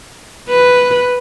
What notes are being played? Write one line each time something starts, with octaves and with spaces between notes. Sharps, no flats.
B4